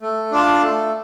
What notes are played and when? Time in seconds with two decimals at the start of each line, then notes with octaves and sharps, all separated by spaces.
0.02 A3
0.31 D4 F4 D5 A5
0.62 A3